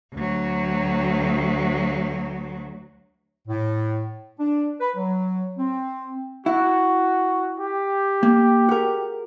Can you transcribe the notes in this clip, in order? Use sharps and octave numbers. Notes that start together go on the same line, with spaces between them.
D2 F#3
A2
D4
B4
F#3
C4
E4 F#4
G4
A#3
F#4 G#4 A#4